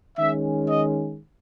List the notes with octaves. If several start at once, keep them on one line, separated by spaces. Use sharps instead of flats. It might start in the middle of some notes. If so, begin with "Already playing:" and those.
D#3 G#3 C#4 E5
D#5